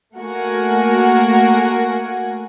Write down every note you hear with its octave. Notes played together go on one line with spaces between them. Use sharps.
A3 A#3 F#4 A#4 F#5 G#5